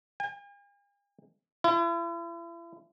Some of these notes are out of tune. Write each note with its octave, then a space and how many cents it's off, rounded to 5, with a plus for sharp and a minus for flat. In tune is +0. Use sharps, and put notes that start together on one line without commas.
G#5 -45
E4 +40